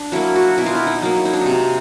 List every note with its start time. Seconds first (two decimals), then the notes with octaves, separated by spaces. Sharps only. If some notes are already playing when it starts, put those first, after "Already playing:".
Already playing: D4
0.12 F#3 A#3 E4
0.36 F#4
0.58 B2 E4
0.66 F4
0.75 E4
0.87 D#4
1.02 F#3 A#3
1.16 E4
1.25 D#4
1.33 D4
1.41 C3 D#4